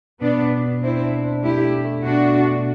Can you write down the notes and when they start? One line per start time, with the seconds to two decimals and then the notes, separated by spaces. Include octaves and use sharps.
0.21 B2 B3 D4
0.42 B2
0.62 D4
0.83 C4 D4 E4
1.03 D4
1.24 D4
1.44 A3 E4 G4
1.64 A3
1.85 A3
2.05 B2 D4 F#4
2.25 A3
2.45 B2